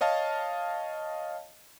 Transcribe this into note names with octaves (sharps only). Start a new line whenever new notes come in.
C#5 D#5 F5 A5